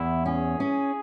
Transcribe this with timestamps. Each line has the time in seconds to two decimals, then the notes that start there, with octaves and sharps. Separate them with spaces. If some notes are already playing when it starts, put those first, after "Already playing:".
Already playing: E2 E4
0.26 C#4 G#4
0.60 C#4